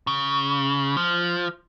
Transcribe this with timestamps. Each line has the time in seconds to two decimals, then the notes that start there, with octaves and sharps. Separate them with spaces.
0.07 C#3
0.97 F3